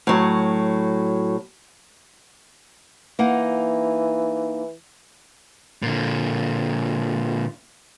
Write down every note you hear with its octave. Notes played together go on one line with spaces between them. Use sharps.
A2 F#3
E3 A#3 D#4 F#5
A#2 D3